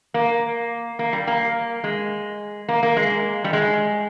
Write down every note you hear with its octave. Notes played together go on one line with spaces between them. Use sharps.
A#3
A#3
G3
A#3
G#3
A#3
A#3
G#3
G3
G#3